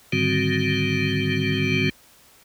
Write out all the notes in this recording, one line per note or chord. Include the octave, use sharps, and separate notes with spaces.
G#2 D3 D#3 G3 C4 F#4